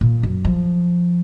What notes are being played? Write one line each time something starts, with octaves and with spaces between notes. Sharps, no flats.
A#2
F#2
F3